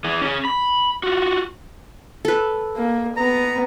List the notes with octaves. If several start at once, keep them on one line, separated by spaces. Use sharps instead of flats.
E3 G#4
C#4 G#4
B5
F4 F#4
A4 B4
A#3
B3 A#5